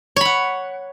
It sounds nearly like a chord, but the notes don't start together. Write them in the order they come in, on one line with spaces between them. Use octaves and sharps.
C#5 B5 F#5